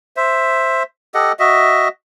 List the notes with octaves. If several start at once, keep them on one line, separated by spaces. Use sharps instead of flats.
C5 E5
G4 A4 D#5 F#5
F#4 D#5 E5